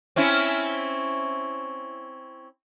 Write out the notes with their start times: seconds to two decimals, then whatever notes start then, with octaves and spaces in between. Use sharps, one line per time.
0.16 C4 C#4 E4